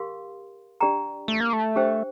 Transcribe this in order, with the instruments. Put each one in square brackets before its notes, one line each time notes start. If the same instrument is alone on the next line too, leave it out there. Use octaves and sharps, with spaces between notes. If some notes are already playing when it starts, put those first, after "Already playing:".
Already playing: [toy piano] G4 A#4 F5 C6
D4 G4 D5 G5 A#5
[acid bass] A3
A#3
A3
[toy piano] D4 G4 C5 G5